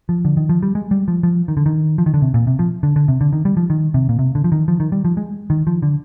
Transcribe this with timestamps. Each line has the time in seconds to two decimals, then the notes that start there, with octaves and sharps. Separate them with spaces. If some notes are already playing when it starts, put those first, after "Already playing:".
0.09 F3
0.25 D3
0.37 D#3
0.49 F3
0.63 G3
0.75 G#3
0.91 G3
1.08 F3
1.23 F3
1.48 D#3
1.57 D3
1.66 D#3
1.98 F3
2.06 D#3
2.14 D3
2.22 C3
2.34 A#2
2.47 C3
2.59 F3
2.83 D3
2.96 D3
3.08 C3
3.21 D3
3.33 D#3
3.45 G3
3.57 F3
3.70 D#3
3.94 C3
4.09 A#2
4.19 C3
4.35 D3
4.44 F3
4.52 D#3
4.68 F3
4.80 D#3
4.92 G3
5.05 F3
5.17 G#3
5.50 D#3
5.67 F3
5.82 D3